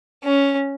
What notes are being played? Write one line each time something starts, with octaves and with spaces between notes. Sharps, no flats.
C#4